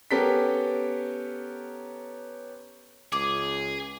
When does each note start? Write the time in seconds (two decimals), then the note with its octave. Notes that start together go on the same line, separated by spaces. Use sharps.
0.11 B3 C#4 G4 A4 A#4 B6
3.12 C#2 G#4 D6